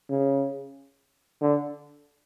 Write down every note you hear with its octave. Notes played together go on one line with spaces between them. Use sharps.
C#3
D3